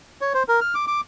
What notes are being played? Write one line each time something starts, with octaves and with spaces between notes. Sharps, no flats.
C#5
C5
A#4
F6
D6
D6